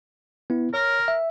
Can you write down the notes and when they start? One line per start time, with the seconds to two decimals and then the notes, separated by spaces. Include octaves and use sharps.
0.50 B3 E4
0.74 A#4 C#5
1.08 E5